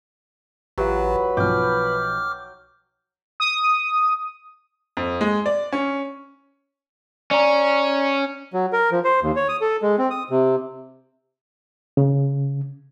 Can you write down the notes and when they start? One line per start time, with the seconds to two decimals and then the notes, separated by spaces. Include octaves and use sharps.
0.78 A1 F#3 F4 G4 B4
1.37 B1 F3 G5 D6 F6
3.40 D#6
4.97 F2
5.21 G#3
5.46 D5
5.73 C#4
7.31 C#4 D5 A#5
8.53 F#3
8.73 A#4
8.91 F3
9.04 C5
9.23 D#2
9.36 C#5
9.49 D#6
9.61 A4
9.82 G#3
9.98 C4
10.10 D#6
10.30 C3
11.97 C#3